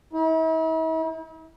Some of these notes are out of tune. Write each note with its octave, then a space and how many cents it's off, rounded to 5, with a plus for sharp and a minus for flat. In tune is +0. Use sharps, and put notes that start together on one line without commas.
E4 -45